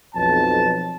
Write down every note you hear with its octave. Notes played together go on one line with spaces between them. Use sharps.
B1 F2 A5